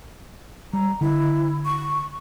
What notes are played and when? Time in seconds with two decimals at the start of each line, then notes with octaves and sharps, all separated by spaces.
0.73 G3 A#5
1.01 D3 E4
1.65 C#6